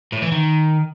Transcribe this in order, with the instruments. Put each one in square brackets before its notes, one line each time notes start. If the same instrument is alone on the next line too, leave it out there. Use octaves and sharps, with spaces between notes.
[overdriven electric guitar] A2
E3
D#3